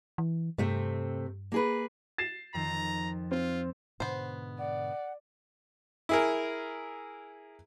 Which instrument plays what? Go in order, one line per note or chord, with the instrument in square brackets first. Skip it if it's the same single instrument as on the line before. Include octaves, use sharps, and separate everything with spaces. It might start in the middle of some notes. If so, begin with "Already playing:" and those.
[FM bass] E3
[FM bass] G2 [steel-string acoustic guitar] C3 A3 C4
[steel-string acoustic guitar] A#3 G#4 B4
[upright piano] A6 C7 E7
[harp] F2 D#3 [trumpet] A#5
[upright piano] C4 [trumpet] F4
[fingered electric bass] G#2 B2 D3 [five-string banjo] B3 C5
[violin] D5 [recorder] F#5
[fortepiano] E4 G#4 A#4